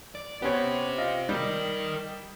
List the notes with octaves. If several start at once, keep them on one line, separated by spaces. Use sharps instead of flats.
D5
B3 C#4 G4 C5 C#5
F4 D#5
G3 D#4 A#4